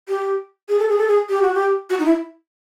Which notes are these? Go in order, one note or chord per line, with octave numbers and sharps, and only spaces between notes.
G4
G#4
A4
G#4
A4
G#4
G4
F#4
G4
F#4
D#4
E4